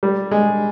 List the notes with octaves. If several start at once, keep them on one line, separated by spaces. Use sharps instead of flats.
G3
G#3